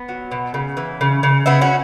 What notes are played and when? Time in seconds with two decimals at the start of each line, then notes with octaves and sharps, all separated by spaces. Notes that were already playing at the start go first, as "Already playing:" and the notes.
Already playing: B3
0.09 F#3
0.32 B2
0.54 C#3
0.77 E3
1.01 C#3
1.23 C#3
1.46 C#3 B3 E4
1.61 C#4 F#4